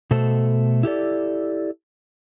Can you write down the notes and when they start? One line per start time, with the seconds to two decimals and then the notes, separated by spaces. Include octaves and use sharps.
0.11 B2 A3 A4 C5
0.83 E4 G4 A4 D5